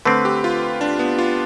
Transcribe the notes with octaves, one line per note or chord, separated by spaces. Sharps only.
D3 A3 C4 B4
G4
F4
D4
B3
F4